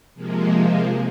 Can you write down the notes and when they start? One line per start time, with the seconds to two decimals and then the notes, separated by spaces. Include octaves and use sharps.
0.15 C3 F3 G#3 A#3